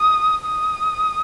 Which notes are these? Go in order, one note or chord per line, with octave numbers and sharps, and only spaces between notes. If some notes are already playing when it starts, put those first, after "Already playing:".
Already playing: D#6
D#6